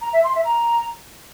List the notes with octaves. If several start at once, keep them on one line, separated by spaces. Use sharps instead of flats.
A#5
E5
C6
E5
A#5